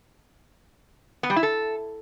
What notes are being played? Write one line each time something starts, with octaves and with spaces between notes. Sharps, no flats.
B3
G3
E4
A4